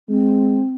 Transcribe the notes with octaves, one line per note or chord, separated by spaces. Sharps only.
G#3 C4